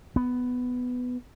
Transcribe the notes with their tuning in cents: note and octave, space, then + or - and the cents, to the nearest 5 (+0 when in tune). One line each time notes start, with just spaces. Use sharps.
B3 +10